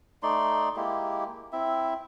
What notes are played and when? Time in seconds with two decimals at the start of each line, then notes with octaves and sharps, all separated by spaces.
0.23 A3 D#4 D5 C6
0.76 G#3 A#3 E4 G4
1.53 C4 E4 E5